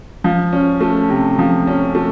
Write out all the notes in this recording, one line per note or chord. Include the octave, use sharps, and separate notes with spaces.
F3
C#4
A3
C3
F3
C#4
A3